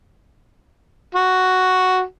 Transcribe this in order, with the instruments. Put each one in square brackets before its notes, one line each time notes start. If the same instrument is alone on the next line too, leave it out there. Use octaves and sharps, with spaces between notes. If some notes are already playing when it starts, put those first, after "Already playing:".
[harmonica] F#4